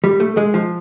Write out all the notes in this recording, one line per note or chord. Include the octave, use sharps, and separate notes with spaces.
G3
A3
G#3
F3